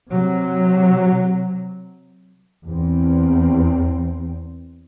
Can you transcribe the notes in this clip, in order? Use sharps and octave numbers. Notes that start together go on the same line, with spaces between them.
C3 F#3
E2 C4